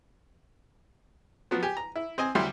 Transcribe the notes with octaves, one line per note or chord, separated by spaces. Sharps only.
F3 F#3 B3
G4 G#5
A#5
E4
C4 D#5 G#5
D2 F#3 G3 E4 G4 C6